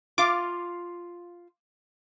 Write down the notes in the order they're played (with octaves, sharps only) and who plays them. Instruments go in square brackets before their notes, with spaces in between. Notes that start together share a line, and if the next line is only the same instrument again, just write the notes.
[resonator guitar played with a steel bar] F4 F5 [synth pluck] D6